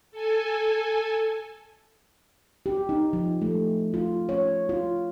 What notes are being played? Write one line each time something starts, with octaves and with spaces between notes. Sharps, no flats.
A4 G#5
G4
D#4
F3
A3
F4
C#5
F4